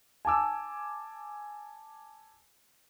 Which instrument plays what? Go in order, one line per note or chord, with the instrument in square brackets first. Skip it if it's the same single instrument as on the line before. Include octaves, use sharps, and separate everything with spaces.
[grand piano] G#5 A5 D6 E6